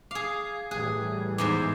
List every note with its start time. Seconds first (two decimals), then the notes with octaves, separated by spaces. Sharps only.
0.11 G#4 F5 D6
0.71 A2 E3 G3 G#4 F#6
1.38 E2 G#2 C5 D6